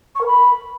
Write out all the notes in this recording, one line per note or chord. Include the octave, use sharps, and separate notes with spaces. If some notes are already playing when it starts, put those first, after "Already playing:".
C#6
A#4
B5